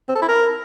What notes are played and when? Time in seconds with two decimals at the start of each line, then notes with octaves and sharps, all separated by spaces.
0.09 C4
0.15 A4
0.22 E4
0.29 A#4